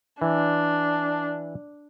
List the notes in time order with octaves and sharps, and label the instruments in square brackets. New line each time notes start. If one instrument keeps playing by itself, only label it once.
[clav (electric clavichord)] E3 [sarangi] D4